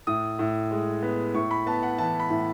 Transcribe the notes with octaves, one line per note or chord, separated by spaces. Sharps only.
A2 D#6
A2
G#3
B3
A2 C#6
B5
B3 A5
F#5
E3 A5
B5
A2